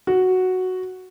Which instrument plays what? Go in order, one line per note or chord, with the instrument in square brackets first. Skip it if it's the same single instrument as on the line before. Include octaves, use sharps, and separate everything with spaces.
[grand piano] F#4